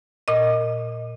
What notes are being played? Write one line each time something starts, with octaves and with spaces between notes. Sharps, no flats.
A#2 D#5